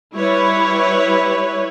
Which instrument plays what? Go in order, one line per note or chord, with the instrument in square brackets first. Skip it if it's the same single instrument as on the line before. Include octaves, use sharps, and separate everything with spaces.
[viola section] G3 E4 B4 C#5